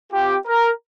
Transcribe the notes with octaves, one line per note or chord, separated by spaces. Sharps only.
C4 F4 G4
A#4